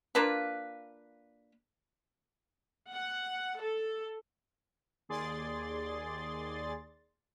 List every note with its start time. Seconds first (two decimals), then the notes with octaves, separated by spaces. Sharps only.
0.15 A#3 D4 F4 B4
2.90 F#5
3.61 A4
5.09 D#2 G#4 D5 C6 A6